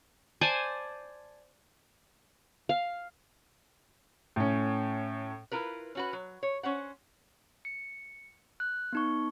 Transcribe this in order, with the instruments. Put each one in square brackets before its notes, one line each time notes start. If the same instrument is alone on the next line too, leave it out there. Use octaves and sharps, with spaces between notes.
[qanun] C5 D5 G#5 A5
F5
[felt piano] A2 C#4
[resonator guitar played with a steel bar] E4 F4 A#4 B4
C#4 F#4 B4
F#3
C#5
C#4 C5 F#5
[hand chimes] C#7
F#6
B3 D#4 C#6